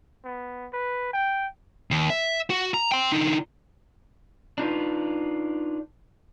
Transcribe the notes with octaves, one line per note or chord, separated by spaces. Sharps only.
B3
B4
G5
D#2
E5
F#4
A#5
G5 C6
D3 D#4
D4 D#4 F4 B4